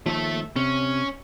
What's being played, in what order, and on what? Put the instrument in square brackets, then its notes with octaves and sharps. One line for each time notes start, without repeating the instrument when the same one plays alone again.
[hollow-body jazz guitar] D#2 D#3 F3 [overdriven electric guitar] A3 E5
[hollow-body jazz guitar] C3 [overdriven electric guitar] C#4